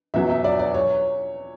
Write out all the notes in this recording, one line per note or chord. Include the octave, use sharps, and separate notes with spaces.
E2 B2 F#3 E5
E5
D5
D5
C#5